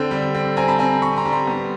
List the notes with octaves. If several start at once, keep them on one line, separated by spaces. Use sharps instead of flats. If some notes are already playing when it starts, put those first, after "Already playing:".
Already playing: D3 C4 G5
G3
C4
C4 G#5 A#5
A5 B5
C4 G#5 A#5
C4 B5 C#6
A#5 C6
G3
A#5 C6
B3